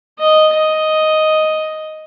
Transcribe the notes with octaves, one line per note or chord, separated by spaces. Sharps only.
D#5
D#5